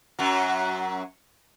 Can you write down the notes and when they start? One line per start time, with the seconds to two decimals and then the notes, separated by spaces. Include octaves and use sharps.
0.19 F#2 F#3